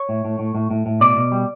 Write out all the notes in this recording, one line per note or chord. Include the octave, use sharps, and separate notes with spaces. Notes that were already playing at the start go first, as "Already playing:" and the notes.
Already playing: C#5
A2
A2
A2
A2
A2
A2
B2 D5
B2
G3